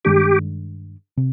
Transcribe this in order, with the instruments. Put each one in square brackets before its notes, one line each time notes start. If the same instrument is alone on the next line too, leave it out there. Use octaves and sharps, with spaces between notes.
[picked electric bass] G2 D#3 G#3 D4 [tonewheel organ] G4
[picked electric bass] C3